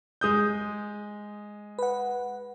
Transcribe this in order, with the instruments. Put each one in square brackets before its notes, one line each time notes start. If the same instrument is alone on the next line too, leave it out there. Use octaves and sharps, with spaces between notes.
[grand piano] G#3 D#6 G6
[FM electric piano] B4 F#5